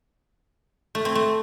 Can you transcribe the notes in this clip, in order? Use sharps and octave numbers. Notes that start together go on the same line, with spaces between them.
A3
C4
A3